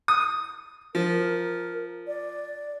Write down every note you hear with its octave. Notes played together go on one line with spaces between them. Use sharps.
D#6
F3 A#4
D5